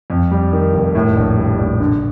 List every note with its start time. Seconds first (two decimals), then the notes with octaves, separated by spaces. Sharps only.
0.10 F2
0.31 G3
0.53 D#3
0.73 F1
0.95 A2
1.16 A#1
1.37 G3
1.59 A#1
1.80 D3